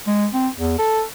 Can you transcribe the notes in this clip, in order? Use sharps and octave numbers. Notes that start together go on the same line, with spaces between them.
G#3
C4
E2
A4